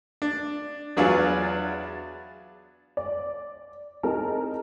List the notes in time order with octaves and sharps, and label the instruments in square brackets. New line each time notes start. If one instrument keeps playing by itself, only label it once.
[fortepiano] D4
E2 F#3 D4 F4 G#4 B4
[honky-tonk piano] D5
C4 D#4 E4 G#4 A#4 A5